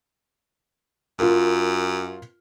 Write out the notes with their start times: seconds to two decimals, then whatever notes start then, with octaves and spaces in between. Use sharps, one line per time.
1.19 F#2 F4 A#4